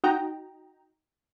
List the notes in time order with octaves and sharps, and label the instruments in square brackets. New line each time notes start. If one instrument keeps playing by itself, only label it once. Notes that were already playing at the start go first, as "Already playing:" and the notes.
[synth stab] D#4 F#4 D#5 G5 A#5